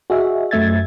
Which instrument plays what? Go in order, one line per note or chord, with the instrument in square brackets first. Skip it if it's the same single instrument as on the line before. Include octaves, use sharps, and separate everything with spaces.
[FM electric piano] F#4 G#4 D#5 E5
F#2 F#3 A3 E5 G#6 A6